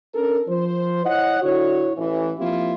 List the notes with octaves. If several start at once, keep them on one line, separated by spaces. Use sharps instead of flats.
C#4 D4 A4 A#4
F3 C5
E4 C#5 D#5 F#5
D3 E4 F#4 C#5
A1 E3
F3 A#3 C4 E4 F4 G4